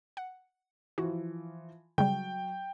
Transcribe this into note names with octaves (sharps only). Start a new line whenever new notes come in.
F#5
E3 F3 F#4
C#3 F#3 G3 G5